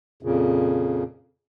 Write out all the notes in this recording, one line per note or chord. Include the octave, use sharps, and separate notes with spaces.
F2 A#2 C#3